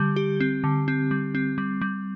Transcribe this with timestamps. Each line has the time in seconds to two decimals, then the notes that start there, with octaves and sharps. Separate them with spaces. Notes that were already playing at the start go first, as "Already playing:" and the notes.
Already playing: D3 G3 G4
0.16 G4
0.40 C4
0.64 D3
0.88 C4
1.11 G3
1.35 C4
1.58 G3
1.81 G3